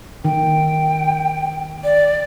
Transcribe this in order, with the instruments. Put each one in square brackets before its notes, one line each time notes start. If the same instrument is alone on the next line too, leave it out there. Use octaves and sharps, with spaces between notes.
[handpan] D#3 [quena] G5
[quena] D5